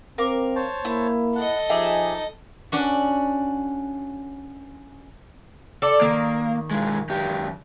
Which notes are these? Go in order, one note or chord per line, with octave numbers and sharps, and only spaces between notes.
C4 A#4 F5 D6
C5 C#5 A5
A#3 E4
A4 D#5 F#5
F3 D#4 G4 G#4 E5
C#4 D4 F#4
A4 D5
D#3 A#3
B1 G#3
F#2 G4